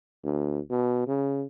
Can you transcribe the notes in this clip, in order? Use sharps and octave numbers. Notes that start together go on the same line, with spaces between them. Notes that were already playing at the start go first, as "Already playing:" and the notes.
D2
B2
C#3